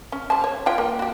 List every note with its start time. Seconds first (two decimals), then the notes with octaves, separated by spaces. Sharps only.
0.12 C#4
0.30 G3 C5 A5
0.44 C#5
0.66 F4 B4 G5
0.78 A#3
0.99 F#4 G4